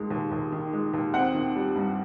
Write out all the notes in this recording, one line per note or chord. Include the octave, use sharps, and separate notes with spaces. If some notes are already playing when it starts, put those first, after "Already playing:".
Already playing: D#2 D#3 G#3
D#2
D#2
D#3
G#3
D#2
C4 F#5
D#3
G3
G2